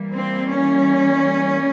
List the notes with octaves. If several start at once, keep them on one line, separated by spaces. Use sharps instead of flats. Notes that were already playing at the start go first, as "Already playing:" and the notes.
Already playing: E3 G3 A#3
C4
C#4